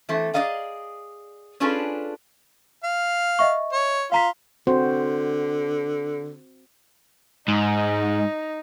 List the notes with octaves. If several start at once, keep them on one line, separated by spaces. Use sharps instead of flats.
E3 A3 C4
G#4 A#4 D5 D#5 F5 A#5
C#4 D4 F4 G#4 A4 B4
F5
D#5 E5 C#6
C#5
F4 F5 A#5 B6
D3 C4 F#4 C5
G#2 D#4